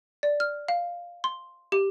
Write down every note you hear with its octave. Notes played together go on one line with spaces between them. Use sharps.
D5
F6
F5
C6
G4